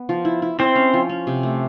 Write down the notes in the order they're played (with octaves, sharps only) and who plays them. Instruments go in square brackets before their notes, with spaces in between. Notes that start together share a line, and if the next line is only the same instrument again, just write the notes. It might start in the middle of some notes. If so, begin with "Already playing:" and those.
Already playing: [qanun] B3
F3
E4
E4
[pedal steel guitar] C4 [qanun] E4
[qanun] C#4
F3
C#4
C3
A3